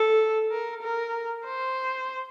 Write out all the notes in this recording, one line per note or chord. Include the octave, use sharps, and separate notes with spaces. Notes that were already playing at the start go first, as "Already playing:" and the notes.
Already playing: A4
A#4
A#4
C5